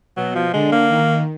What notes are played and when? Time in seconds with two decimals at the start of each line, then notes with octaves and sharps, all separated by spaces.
0.16 B2 F#3
0.35 F3
0.53 D3 G#3
0.72 A#3
0.90 D#3